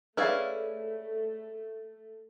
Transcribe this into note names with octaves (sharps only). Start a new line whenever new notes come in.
A3 C#4 E4 G#4 B4 D5 F5